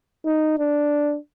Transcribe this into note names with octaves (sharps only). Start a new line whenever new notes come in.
D#4
D4